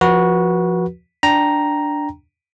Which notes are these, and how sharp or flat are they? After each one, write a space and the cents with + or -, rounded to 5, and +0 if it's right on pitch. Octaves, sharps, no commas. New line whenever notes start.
F3 -5 F#4 +0 B4 -35
D4 +0 G5 -10 A#5 +5